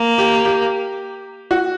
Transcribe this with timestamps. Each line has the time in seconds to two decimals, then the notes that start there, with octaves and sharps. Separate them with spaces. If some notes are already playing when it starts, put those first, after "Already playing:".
Already playing: A#3
0.18 G4
0.45 G4
1.51 F#4